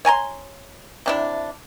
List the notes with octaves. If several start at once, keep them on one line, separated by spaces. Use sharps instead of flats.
C#5 G#5 A#5 C6
C3 D4 E4